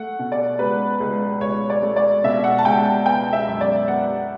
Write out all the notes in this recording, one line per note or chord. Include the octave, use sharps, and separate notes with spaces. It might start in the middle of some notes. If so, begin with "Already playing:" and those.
Already playing: A3 F#5
B2
D5
C#2 B4
C#2
C#2 C#5
D5
A3
D5
B2 E5
F#5
A5
C#2 G5
A5
B3 G5
E5
F#2
D5
B3 F#5